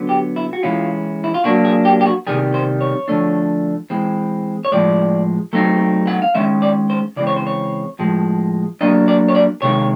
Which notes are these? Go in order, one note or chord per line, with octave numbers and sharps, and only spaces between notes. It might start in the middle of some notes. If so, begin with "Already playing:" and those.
Already playing: D3 F#3 B3
G4
E4
F#4
E3 G#3 C#4 E4 F4
E4
F4
F#3 A#3 D4 F#4
G#4
G4
G4
F#4
C3 D#3 G3 G#4
C5
C#5
D3 F3 A3 D4
E3 G#3 C4
C#5
A2 F3 G#3 D5
F#3 A3 C4 D#4
F#5
F5
D#3 G#3 C#4 E5
D5
C5
C#3 E3 G#3 C4 D5
C#5
C5
C#5
A2 F3 G#3
F#3 A#3 D4 D#5
D5
C#5
D5
C3 D#3 G#3 C#5